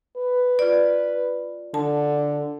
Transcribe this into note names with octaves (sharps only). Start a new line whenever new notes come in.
B4
F4 D5
D3 A5